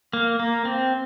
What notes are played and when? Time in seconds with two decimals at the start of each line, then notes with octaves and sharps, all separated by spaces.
0.13 A#3
0.39 A#3
0.65 C4